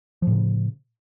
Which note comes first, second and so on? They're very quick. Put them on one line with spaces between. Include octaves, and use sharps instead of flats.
F3 A2 C#3